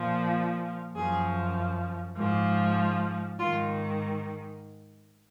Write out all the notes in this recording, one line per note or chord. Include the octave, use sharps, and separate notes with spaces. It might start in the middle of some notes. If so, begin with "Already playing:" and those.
Already playing: A#2 F3
F#2 F3 G#4
G#2 F3
G#2 D#3 F4